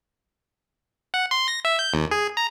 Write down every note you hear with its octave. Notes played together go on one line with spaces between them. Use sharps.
F#5
C6
A#6
E5
G6
D#2
G#4
A#5